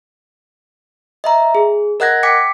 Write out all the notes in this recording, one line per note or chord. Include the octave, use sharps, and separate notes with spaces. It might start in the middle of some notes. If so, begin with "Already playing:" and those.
D#5 E5 A#5
G#4
A#4 D#5 F#5 F#6 G#6 A#6
G5 D6 B6 C#7